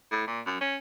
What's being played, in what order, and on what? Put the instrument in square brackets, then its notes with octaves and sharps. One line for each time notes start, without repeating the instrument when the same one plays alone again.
[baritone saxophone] A2
A#2
F#2
C#4